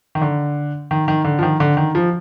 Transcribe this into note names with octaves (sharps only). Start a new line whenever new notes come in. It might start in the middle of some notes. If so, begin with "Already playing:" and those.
D#3
D3
D#3
D#3
D3
F3
D#3
D3
D#3
F3